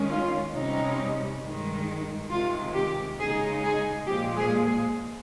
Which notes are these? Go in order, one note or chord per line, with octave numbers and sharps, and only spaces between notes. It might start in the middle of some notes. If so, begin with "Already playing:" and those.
Already playing: D#3 G#3 C#4
F4
C3 G3 C#4 D#4
G2 D#3 G#3
C3 D#3 G#3 F4
G4
C#3 G#3 D#4 G#4
G#4
A#2 F3 G#3 G4
G#4
G#4